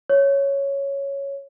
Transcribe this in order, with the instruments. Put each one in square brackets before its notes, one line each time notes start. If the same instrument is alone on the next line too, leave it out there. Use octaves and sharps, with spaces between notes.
[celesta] C#5